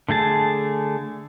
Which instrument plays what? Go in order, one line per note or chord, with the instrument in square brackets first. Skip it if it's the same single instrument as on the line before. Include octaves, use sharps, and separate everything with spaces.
[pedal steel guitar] D3 A3 G#4 A5